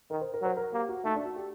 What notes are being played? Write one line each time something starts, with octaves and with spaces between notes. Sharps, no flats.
D#3 A#4
C5
A#4
F#3 C5
A#4
A#3 G4
F#4
A3 D#4
D4
F#4
G4